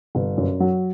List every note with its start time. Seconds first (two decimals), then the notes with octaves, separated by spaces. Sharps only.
0.15 G1
0.37 F#2
0.60 F#3